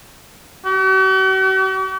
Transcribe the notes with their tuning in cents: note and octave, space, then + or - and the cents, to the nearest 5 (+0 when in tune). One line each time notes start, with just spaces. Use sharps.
F#4 +45